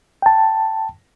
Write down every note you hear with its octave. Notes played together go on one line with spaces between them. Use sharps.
G5 A5